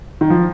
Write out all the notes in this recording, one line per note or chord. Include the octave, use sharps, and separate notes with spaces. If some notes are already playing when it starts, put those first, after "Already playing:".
D#3
F3